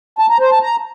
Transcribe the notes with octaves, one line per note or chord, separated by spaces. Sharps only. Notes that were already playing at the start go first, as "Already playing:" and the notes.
A5
A#5
C5
A5
A#5